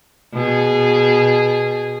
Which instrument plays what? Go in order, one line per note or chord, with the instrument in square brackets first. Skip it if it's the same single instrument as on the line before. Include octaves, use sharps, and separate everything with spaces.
[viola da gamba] B2 G#4